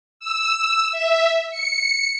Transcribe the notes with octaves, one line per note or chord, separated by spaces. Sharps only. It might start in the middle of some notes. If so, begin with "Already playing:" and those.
E6
E5
C#7